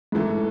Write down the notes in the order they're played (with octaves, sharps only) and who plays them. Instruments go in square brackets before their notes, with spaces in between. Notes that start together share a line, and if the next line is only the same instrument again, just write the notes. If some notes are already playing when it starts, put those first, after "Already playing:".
[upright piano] G#2 E3 A3